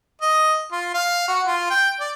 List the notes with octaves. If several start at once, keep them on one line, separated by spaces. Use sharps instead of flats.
D#5
F4
F5
F#4
F4
G5
D5